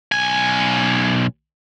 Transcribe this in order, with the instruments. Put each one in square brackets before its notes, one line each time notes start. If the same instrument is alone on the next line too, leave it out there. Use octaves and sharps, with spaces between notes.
[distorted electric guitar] B1 G#5